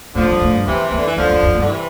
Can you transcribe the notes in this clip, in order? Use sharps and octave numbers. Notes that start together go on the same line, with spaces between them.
A2 D3 F3
G2
A2
G2
F2 C3 E3
F2 C3
D3
E3
E2 D3 F3
F2
F2
G2
D3
C3 E3